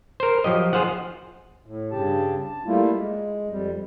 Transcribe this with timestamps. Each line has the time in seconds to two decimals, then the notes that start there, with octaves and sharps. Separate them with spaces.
0.20 A#4 C5
0.44 F3 F#3 G4 D#5
0.73 F4 G#4 C5 F5 F#5
1.66 A2
1.91 G2 C#3 G4 A5
2.40 A5
2.66 G3 A3 A#3 E4 F4
2.96 G#3
3.49 F2 G3